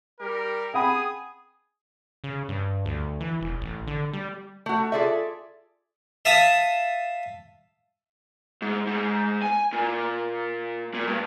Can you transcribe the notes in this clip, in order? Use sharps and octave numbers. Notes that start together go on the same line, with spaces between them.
G3 G4 A#4
G#4 F#5 G5 B5 D#6
C#3
G2
D2
E3
E1
A1
D3
G3
A3 F#4
F4 G#4 A4 D5 E5
E5 F5 A5 D#6
G#2
G#2
G#5
A#2
A#2
G2